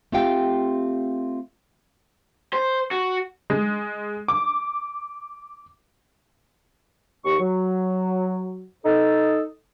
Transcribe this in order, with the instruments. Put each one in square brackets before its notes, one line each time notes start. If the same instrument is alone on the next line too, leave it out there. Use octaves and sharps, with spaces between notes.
[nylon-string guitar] A3 C4 F4 G4 F5 G5
[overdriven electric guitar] C5
F#4
[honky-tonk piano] G#3
D6
[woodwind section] D#2 C#6
F#3
D#4 A4